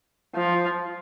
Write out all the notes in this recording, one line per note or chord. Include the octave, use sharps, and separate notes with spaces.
F3